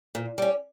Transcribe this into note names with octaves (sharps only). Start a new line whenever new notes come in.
A#2
G3 C#4